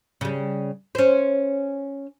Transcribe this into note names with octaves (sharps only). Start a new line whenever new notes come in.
C#3 G3
C#4 C5